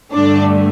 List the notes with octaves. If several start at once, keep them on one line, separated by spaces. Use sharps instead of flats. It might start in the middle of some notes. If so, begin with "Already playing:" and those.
G2 D3 A3 D4